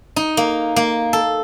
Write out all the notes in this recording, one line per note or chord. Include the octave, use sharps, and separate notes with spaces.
D#4
A#3
A#3
A4